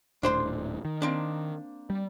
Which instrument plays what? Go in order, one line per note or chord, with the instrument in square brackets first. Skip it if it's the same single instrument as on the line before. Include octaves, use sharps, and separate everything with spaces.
[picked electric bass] D#1 A2 [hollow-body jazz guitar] D4 C5 C6
[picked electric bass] D#3
[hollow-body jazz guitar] A#3 C4 D4
[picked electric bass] G3